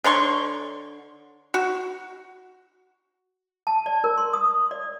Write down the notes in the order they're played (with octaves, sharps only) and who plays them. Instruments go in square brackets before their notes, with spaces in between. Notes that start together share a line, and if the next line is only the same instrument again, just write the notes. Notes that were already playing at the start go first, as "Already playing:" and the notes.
[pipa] D3 C#5 C6 C#6
F#4
[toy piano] A5
D5
A#4
C6
D#6
D5